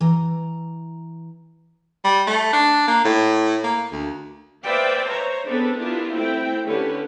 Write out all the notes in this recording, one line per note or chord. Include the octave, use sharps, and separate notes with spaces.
E3 A#5
G3
A3
D4
A#3
A2
A#3
D2
B4 C5 D5 E5 F5 G5
C5 C#5 A#5
B3 C4 D4 G#4 A4 B4
B3 D4 E4 F4 G4 A#4
A3 C4 E4 G5
D3 A3 C#4 G4 B4